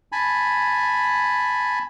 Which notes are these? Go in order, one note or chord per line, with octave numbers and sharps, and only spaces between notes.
G#5 A5 B5